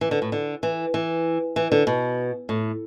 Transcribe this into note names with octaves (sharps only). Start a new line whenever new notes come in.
E3
D3
A2
D3
E3
E3
E3
D3
B2
A2